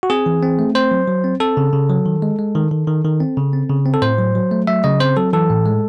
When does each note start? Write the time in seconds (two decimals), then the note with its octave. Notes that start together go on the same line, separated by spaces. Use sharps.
0.03 F#4
0.10 C4 G#4
0.26 E3
0.43 C4
0.59 A3
0.75 C4 C5
0.91 F#3
1.07 F#3
1.24 C4
1.40 C4 A4
1.57 C#3
1.73 C#3
1.90 F#3
2.06 D#3
2.22 G#3
2.39 G#3
2.55 D#3
2.71 D#3
2.87 D#3
3.04 D#3
3.20 C4
3.37 C#3
3.53 C4
3.69 C#3
3.86 C4
3.94 A4
4.02 A2 C5
4.19 F#3
4.35 F#3
4.51 A3
4.67 F#3 E5
4.84 C#3 D#5
5.00 C4 C5
5.17 F#3 A4
5.33 E3 A4
5.50 A2
5.66 G#3